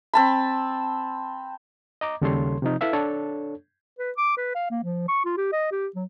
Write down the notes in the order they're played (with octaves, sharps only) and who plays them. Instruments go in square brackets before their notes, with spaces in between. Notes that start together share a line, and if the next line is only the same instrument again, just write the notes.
[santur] C4 A5 B5
[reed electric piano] D#5 A#5 D6
D#2 C#3 G3 A4 C#5 C6
C3 F3 D#4
E4 A4 B4 E5 F5
D4 A4 C#5
[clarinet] B4
D6
B4
F5
A#3
F3
C#6
F4
G4
D#5
G4
F#3